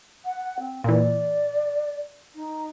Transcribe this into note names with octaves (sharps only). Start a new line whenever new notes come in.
F#5
C4
A#2 E3 D5
D#4